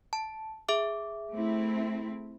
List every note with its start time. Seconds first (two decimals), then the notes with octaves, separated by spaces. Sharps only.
0.13 A5
0.69 G#4 E5 D6
1.35 A3 C4 E4